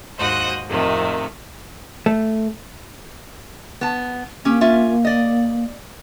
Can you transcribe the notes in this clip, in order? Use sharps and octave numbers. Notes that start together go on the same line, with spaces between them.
D#2 G#2 F#4 C5 D#5 F#6
F2 A2 C3 D#3 A3
A3
B3 A5
A#3 C#4 G4
C#4 F4 E5
D5 D#5